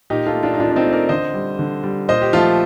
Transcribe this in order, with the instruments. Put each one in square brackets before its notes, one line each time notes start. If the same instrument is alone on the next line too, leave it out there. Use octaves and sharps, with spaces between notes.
[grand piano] A#2 D#4 G4
F4 A4
A3
D4 F4
D#4
A#2 D4 F4
D4
C4 D#4
A3
A#4 D5
D3 C5 D#5
G3
D3
G3
A#2 C5 D#5
G4
F3 A3 F4 A4